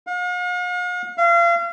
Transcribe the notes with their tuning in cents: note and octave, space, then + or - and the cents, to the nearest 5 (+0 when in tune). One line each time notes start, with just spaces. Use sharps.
F5 +45
F5 -35